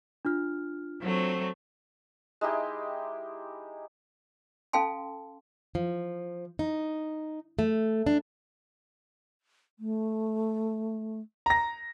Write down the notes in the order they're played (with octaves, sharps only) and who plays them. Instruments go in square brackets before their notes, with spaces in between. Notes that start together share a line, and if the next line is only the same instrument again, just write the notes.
[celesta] D4 F4 F6
[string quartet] F#3 A3 C4
[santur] G#3 D#4 E4 G4
[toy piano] C#4 A4 F5 G5 A5 C6
[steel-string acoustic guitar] F3
D#4
A3
D4
[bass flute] A3
[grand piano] A#5 A#6